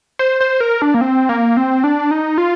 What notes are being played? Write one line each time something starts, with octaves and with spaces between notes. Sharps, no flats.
C5
C5
A#4
D4
A#3
C4
A#3
C4
D4
D#4
F4